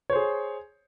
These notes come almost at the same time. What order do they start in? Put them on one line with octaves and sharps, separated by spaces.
C#5 C5 G#4